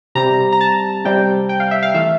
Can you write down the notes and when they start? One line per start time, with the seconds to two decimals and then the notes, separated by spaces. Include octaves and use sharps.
0.15 C3 G3 C4 A#5
0.53 A#5
0.61 A5
1.05 C3 G3 C4 G5
1.49 G5
1.60 F5
1.71 E5
1.83 F5
1.94 E3 A3 E5